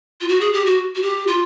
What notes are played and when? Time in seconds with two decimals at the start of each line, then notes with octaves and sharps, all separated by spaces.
0.21 F4
0.28 F#4
0.41 G#4
0.53 G4
0.66 F#4
0.95 F#4
1.02 G4
1.27 F4